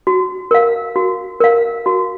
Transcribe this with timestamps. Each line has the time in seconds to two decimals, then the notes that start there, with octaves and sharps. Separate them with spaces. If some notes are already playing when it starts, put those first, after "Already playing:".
0.07 F#4
0.51 A#4 F5
0.96 F#4
1.40 A#4 F5
1.86 F#4